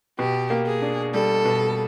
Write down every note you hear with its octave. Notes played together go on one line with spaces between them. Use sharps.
B2 G4
A#3
G#4
D4
G3 A4
B2